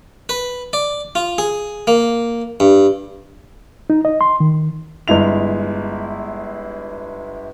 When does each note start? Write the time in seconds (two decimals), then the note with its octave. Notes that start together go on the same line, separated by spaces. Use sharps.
0.29 B4
0.73 D5
1.15 F4
1.38 G#4
1.87 A#3
2.60 G2
3.90 D#4
4.05 D#5
4.21 C6
4.40 D#3
5.08 G1 G#3 E4 F7